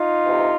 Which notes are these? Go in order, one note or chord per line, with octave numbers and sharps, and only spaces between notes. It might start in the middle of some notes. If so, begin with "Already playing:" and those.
Already playing: D#4 F4
D2 C3 E3